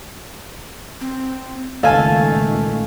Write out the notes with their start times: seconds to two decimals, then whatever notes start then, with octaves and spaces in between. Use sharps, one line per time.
1.01 C4
1.83 C#2 A#2 D#3 A3 A4 F5 G#5 A5